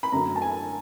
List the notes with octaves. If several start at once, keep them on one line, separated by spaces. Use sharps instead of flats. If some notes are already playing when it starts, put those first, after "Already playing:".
B5
F#2 D3 F#3 A3 A#5
A5
G#5